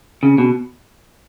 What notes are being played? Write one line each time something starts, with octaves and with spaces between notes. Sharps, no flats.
C#3
B2